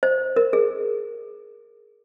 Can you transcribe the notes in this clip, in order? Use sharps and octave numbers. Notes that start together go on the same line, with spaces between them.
C5
A#4
G#4